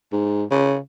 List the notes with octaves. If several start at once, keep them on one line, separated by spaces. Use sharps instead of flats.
G#2
C#3